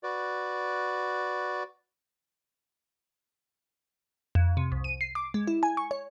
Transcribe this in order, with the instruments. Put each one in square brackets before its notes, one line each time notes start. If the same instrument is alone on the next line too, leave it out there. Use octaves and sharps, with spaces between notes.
[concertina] F#4 B4 D5
[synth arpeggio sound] F2
C3
C2
D#7
C7
D6
G#3
E4
G#5
C#6
C#5